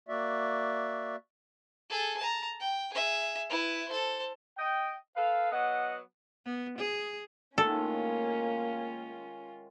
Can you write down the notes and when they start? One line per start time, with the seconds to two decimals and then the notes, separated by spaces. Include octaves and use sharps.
0.08 A#3 F#4 D5 E5
1.90 G#4 A4
2.18 A5 A#5
2.60 G5
2.93 G#4 E5
3.50 E4 B4
3.88 A4 C5
4.58 D#5 G5
5.16 A4 B4 F5
5.52 F#3 B3 D#5 F#5
6.45 B3
6.78 G#4
7.58 A2 D#3 G#3 A#3 C#4 F4 A4